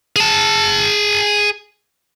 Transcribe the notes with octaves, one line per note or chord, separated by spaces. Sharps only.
G#4 A5